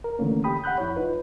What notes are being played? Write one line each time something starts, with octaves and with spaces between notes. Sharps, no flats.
A#4
D3 E3 A3 A#3 C#4
G4 G5 B5 D#6
F#5 B5 F#6 G6
F2 E4 C#5
D#4 F4 B4